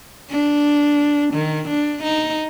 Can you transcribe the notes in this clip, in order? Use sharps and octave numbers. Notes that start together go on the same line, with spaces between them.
D4
D#3
D4
D#4